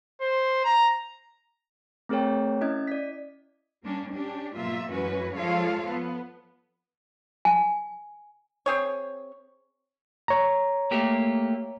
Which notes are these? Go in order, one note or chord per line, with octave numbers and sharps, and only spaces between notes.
C5
A#5
A3 C4 G#4 A#4 C#5 G5
C#4 E4 D#5 G#6
D5 B6
G3 A#3 C#4 D4
C#4 D4 G4
G#2 B2 F#3 A#3 F4 E5
F#2 E3 G#3 C#4 F#4 B4
F3 G#3 F4 A4 C#5 F5
B3
G#5
C4 G#4 C#5
C#5 A#5
A3 A#3 G4